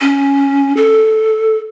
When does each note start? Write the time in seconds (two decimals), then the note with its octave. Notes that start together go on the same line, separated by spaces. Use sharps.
0.01 C#4
0.77 A4